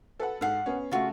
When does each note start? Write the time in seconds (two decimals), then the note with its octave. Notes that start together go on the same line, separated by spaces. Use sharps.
0.20 A4 B4 F#5
0.41 G#2 A4 F5 F#5 C7
0.66 B3 C#4
0.91 C#3 A3 F4 F#4